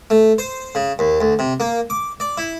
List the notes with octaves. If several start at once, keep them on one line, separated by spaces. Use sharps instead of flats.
A3
C5
C#3
D#2
D2
C3
A#3
D6
D5
E4